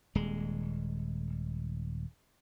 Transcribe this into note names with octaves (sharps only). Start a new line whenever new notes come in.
D#1 G#3